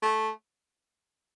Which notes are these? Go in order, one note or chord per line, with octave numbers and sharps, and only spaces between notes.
A3